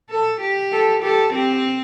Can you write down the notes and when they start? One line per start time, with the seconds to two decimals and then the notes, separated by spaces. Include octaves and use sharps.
0.10 A4
0.41 G4
0.72 A4
1.03 G4 A4
1.34 C4 G4